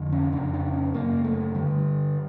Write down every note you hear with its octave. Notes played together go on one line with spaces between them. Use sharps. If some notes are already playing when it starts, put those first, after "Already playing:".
Already playing: F2 D3
C#4
F2 C#3 D4
D4
C#4
F#2 C#3 A#3
A3
G2 D3 G3